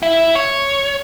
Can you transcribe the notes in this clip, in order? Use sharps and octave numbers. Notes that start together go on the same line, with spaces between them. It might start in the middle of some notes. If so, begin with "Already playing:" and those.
E4
C#5